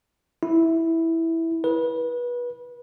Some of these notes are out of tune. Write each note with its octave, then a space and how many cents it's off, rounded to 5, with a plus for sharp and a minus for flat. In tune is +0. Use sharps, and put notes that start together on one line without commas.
E4 -5
B4 -25